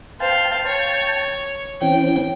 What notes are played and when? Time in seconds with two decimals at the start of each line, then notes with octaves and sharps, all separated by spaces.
0.20 C5 F5 G5 A5
0.67 C#5
1.82 E3 C4 C#4 G5